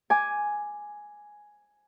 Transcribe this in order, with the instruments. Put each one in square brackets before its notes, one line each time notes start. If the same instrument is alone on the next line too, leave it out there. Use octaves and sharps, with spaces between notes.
[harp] G#5 D6